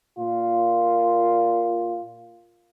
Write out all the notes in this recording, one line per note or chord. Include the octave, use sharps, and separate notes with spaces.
A#2 F4